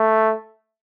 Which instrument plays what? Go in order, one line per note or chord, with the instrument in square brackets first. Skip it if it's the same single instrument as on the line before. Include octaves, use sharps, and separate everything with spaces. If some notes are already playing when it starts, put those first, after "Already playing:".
Already playing: [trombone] A3